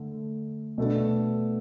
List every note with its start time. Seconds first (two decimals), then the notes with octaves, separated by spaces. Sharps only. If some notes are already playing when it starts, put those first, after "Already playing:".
Already playing: D3 A3
0.78 B2 A3 D4